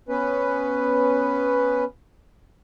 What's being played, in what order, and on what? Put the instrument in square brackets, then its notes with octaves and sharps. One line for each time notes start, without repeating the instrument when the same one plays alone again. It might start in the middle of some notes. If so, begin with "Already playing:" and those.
[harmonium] B3 C#4 B4